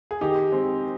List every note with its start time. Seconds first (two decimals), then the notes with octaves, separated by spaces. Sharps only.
0.11 G#4
0.21 D#3 D#4 G4
0.52 G#3 C4